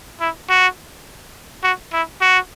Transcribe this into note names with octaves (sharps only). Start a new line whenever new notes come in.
E4
F#4
F#4
E4
F#4